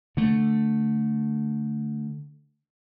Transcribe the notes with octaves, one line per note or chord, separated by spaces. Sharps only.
D3 A3